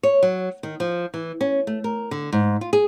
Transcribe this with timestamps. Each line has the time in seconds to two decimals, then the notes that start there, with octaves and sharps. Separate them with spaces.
0.03 C#5
0.23 F#3
0.63 D#3
0.80 F3
1.14 E3
1.41 C#4
1.67 A3
1.84 A#4
2.11 D3
2.33 G#2
2.61 F4
2.73 G#4